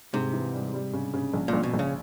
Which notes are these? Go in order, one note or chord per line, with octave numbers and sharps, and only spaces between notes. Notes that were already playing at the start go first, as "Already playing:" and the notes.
G#2 C3
E3
G3
G3
C#3
C#3
A#1
A#2
A#1
B2
A#1
C#3